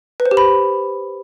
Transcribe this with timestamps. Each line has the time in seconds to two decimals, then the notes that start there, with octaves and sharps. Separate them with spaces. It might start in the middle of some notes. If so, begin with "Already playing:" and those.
0.20 B4
0.26 C5
0.31 G4
0.37 B5